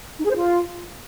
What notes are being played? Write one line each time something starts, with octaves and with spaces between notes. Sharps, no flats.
D#4
G#4
C5
F4